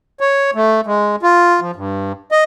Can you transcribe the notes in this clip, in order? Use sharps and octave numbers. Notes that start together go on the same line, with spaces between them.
C#5
A3
G#3
F4
F3
G2
D#5